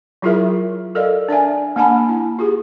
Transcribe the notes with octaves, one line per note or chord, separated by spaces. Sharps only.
F#3 E4 F4 G#4 A#4 E5
A4 A#4 D5 D#5 F5
D4 D5 E5 G#5
A#3 D4 F#5 G#5 A5 B5
E4
F4 G4 G#4